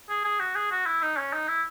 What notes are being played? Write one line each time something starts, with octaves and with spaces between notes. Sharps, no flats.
G#4
G#4
F#4
G#4
F#4
E4
D#4
C#4
D#4
E4